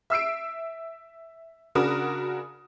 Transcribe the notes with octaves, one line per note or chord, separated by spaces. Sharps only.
E5 E6 C7 D7
C#3 D4 F#4 A#4 B5 D#6